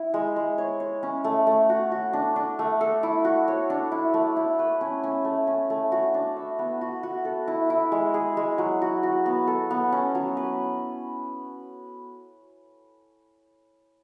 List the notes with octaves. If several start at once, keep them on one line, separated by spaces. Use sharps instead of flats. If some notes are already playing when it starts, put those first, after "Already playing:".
Already playing: E4
G#3
G#3
C#5
C#5
C#4
A3
A3
F#4
F#4
D4
D4
A3
A4
E4
F#4
C#5
D4
E4
A3
E4
B4
C#4
C#4
A3
C#4
A3
F#4
D4
E5
B3
F#4
F#4
A4
E4
E4
G#3
G#4
G#3
F#3
F#4
F#4
B3
A4
B3
C#4
F#3
B4